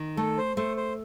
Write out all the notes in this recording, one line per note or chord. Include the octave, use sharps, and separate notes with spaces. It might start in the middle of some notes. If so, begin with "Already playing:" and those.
Already playing: D#3
A3 A4
C5
A3 C5
C5